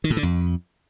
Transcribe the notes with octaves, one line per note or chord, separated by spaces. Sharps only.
D#3
A2
D3
F2